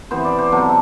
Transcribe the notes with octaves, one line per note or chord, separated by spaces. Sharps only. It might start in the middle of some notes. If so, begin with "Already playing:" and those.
C3 E3 B3 C5
D5
C5
C3 F#3 B3 A4